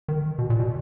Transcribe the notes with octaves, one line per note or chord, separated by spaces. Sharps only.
D#3
B2
A#2
B2